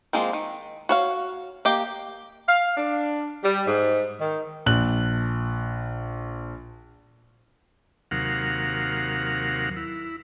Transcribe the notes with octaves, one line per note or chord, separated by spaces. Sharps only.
F3 G#3 A#3 C4
D#3
F#4 C#5 F5
A#3 G4 D#5
F5
D4
G3
G#2
D#3
A#1 F#6 F#7
D#2 C3 F#3 A#4 F5 F#5
E4